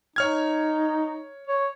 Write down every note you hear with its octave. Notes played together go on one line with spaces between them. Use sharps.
D#4 C#5 F6 G#6
C#5